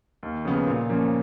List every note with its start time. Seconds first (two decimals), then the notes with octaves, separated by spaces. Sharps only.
0.23 D#2
0.45 C#3 F3 B3
0.67 A#2
0.90 F3 A#3 C#4